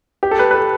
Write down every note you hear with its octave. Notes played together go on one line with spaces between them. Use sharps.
G4
A4
B4
B4
A4